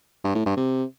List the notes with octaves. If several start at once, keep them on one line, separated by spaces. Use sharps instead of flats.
G2
A2
G2
C3